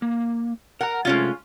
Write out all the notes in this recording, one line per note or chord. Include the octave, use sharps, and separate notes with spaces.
A#3
A#4 F#5 A#5
C3 G#3 A3 C#4 F4